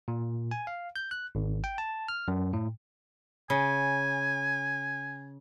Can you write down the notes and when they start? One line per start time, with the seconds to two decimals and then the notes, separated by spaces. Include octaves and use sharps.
0.08 A#2
0.51 G#5
0.67 F5
0.96 G6
1.11 F#6
1.35 G#1
1.64 G5
1.78 A5
2.08 F6
2.28 F#2
2.53 A2
3.50 C#3 G#5